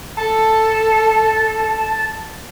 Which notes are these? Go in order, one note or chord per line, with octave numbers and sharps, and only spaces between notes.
A4 A5